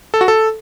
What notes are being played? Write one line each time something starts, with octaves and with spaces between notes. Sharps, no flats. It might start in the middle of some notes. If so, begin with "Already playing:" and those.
A4
F#4
A4